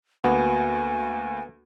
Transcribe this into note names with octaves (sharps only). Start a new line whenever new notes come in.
D2 A#3 B3 F#4 G#5